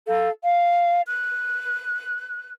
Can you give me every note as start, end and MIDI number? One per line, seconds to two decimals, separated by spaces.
0.07 0.29 69
0.07 0.29 77
0.43 1.02 77
1.07 2.50 90